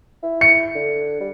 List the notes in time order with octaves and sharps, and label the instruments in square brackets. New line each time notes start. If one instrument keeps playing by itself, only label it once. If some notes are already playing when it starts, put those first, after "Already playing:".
[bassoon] E4
[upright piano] C#7
[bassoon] D3
G3